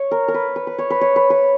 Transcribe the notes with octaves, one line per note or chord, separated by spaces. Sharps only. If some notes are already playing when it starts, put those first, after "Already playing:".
Already playing: C#5
A#4
A#4
B4
B4
B4
C#5
B4
C#5
B4
B4